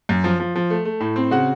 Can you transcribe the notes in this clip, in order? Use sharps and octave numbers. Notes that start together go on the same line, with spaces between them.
F#2
F3
F3
F3
A3
A3
A2
C4
C#3 F#4 F#5